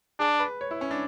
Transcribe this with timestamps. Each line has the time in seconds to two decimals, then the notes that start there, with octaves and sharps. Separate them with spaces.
0.19 D4 G#4
0.40 B4
0.61 C#5
0.71 E4
0.81 C#4
0.91 D4